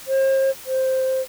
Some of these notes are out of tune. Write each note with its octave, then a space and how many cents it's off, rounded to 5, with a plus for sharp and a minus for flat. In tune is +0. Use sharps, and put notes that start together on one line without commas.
C5 +40
C5 +0